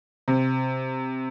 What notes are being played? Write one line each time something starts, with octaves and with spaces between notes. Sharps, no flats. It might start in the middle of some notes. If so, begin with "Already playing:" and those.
C3